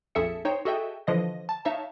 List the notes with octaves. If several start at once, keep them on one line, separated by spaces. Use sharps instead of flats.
A#1 F2 G#4 A4 E5 C#7
D#4 C5 C#5 G5
F#4 G#4 A4 D#5 E5 G5
D3 E3 F3 D#5 A#6
A5
D#4 C#5 E5 F5 A5